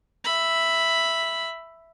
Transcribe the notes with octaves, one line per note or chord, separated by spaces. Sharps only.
E5 B5